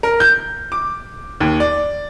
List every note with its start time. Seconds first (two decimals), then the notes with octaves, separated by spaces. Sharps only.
0.03 A#4
0.20 G6
0.72 D6
1.40 D#2
1.60 D5